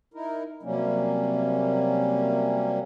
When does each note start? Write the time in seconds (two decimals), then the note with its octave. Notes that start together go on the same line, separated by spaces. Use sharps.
0.14 D#4 E4 A#4
0.63 C3 F#3 G3 A#3 C#4